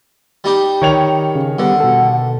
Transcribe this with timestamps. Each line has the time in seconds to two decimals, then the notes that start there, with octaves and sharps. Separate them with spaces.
0.44 G3 D#4 G4
0.82 D#3 C#5 F7
1.35 C#3
1.59 D3 G3 B3 G4 F#5
1.80 B2 A4